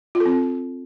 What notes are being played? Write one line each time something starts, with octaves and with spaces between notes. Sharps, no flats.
F4
A4
C4